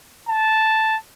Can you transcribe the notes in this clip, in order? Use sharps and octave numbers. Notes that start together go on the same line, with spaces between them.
A5